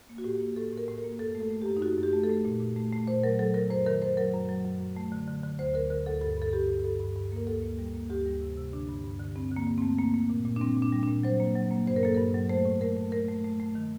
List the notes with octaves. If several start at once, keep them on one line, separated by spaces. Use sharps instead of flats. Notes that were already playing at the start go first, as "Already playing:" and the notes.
A#3
F#4
A2 G4
A#3
A2 A4
A2
A#4
A2
A#4
A#3
F#2 A4
A3
A4
A3
F#2 G4
D#4
F#2 F#4
F#2 G4
A3
A4
A3
A#2
A#2
A3
A3
A#2 C5
F#3 A#4
F#3 A4
F#3 A#4
F#2 C5
D#3 A#4
F#2 C5
F#3 A#4
F#2
F#3
F#2
F#2
A3
D3
D3
D3
D2 C5
D3 A#4
D3 A#4
D2 A4
G2 A4
G2 A4
G2 G4
G2
G2 A4
G2
G2
A#3 A#4
D2 A4
A#3
G3
A#3
D2 G4
G3
C3
C3
D3 D4
G2
G2
D3
G2 C4
D3
A#3
G2
A3 C4
A#3
A#3
A#2
A#2
D4
G3 C4
A#2
D4
G3
A#2 D4
F#3 C5
A#3
F#3
A#3
G2 C5
A#4
A#3 A4
G2 A#4
F#3
A3 C5
A2
A3 A#4
A3
A3 A#4
A3
A3
A3
D#3